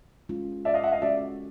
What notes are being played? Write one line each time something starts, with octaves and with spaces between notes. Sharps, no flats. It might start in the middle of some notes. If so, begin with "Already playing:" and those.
G#3 C#4 F4
D5 E5
D#5 F5
E5 F#5
D#5 F5
G#3 C#4 F#4 A4 D5 E5